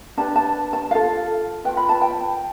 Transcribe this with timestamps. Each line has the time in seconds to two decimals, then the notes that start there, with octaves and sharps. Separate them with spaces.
0.17 D4 G4 B4 A5
0.36 A5
0.73 A5
0.91 F4 A4 F5
1.64 F4 B4 G5
1.77 B5
1.89 A5
2.01 G5